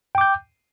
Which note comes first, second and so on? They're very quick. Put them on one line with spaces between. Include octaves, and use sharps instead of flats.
G5 D6 G6